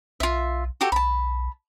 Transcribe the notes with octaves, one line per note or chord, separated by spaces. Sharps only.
B1 F4 E5
F#4 G4 A4
B1 A5 B5